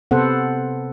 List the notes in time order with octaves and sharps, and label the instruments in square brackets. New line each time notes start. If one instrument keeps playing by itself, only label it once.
[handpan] C3 B3 A4 C5 F#5